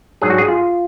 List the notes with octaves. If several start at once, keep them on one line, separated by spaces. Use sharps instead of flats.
G#2 F#3 D4 G#4
F#4
G#4
F4